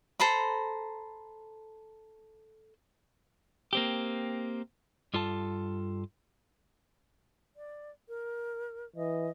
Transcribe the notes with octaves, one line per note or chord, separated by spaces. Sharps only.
A4 C5 A#5 B5
A#3 C4 G4
G2 F4 A4 A5
D5
A#4
E3 D#5